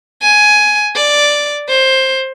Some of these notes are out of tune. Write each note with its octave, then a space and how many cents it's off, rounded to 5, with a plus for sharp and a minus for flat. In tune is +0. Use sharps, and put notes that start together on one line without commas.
G#5 +10
D5 +0
C5 +15